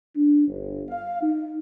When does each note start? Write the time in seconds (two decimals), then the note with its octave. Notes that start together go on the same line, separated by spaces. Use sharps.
0.16 D4
0.47 G1
0.90 F5
1.22 D#4